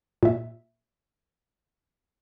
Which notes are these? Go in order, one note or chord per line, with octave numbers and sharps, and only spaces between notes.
A#2 E5